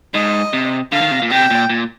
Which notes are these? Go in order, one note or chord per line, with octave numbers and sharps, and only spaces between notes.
G#2 D#5
C3
D3 F5
D#3
C3
A#2
C3 G5
A#2
A#2